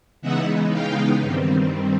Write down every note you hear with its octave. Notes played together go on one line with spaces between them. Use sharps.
C#3 E3 G#3 B3 D#4 E5 F#5
F5 G5
G2 D#3 G3 C4